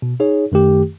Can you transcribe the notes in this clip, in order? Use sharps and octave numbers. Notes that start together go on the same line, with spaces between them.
B2
D#4 G#4 C#5
F#2 D#3 A3 G4